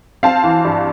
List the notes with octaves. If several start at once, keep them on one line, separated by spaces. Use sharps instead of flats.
C4 F5 A5
E3
G2